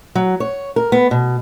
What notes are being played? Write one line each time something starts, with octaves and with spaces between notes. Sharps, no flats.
F#3
C#5
A#4
B3
B2